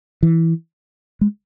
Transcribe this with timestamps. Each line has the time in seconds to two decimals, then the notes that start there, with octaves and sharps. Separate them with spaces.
0.23 E3
1.21 G#3